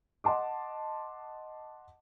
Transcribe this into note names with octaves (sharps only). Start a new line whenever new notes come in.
D#5 F#5 A5 C6 D6